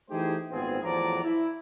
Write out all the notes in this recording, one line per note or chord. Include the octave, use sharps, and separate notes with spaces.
E3 A3 D#4 G4 G#4 C5
G#1 A#2 B3 C4 F4 G#4
E2 A2 F3 F#3 D5 A#5
E4